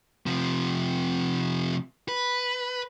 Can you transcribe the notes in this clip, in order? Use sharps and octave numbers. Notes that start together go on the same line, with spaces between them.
C3 F3
B4